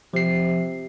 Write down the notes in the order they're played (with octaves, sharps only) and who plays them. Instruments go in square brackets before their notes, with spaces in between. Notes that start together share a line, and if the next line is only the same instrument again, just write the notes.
[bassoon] C3 [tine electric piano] F3 C7